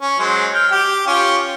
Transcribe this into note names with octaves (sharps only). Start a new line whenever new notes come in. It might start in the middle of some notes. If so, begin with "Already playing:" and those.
C#4
F#3 G#3 C5
G5 F6
G4
C#4 F4 G4